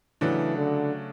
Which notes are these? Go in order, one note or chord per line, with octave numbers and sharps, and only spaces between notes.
C#3 E3 F#3 A3 D4 F#4
D3